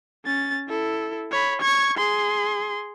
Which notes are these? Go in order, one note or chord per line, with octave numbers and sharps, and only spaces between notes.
C#4 A6
E4 A4
C#5 B5
C#6 G#6
G#4 C6